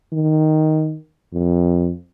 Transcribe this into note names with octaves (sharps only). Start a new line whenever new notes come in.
D#3
F2